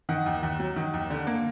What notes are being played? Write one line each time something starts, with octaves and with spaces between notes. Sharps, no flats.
D#3 F#5
D#2
D#2
F#3
D#3
D#2
D3
A#3